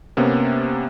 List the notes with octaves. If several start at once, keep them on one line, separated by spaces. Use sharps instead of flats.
C3 A#3 B3 C#4